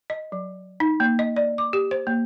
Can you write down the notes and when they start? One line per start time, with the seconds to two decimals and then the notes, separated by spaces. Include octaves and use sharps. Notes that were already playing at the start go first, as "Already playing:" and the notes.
0.10 D#5
0.32 F#3
0.80 D#4
1.00 A#3
1.19 D#5
1.36 D5
1.58 D6
1.73 G4
1.91 C5
2.07 A#3